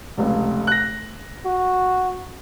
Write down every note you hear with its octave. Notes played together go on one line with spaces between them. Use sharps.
F1 C#2
F#6 A#6
F#4